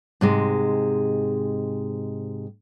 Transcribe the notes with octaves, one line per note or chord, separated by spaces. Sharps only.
G#2 C3 G#3